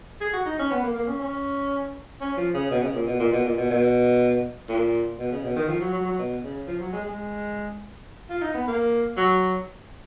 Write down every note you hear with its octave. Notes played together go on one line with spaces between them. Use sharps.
G#4
F#4
D#4
C#4
B3
A#3
A#3
C#4
C#4
C#4
F3
C#3
B2
C#3
A#2
B2
A#2
B2
A#2
B2
B2
A#2
B2
C#3
B2
D#3
F3
F#3
F#3
F#3
B2
C#3
F3
F#3
G#3
G#3
F4
D#4
B3
A#3
F#3